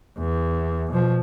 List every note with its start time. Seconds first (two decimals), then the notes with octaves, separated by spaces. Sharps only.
0.18 E2
0.92 B2 F3